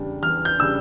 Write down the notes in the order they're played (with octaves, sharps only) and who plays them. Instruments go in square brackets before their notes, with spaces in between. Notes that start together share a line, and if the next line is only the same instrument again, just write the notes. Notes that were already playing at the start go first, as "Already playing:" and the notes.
Already playing: [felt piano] E2 C#3 G3 D4
[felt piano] E2 [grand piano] F6
[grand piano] G6
[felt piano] C#3 G3 D4 [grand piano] E6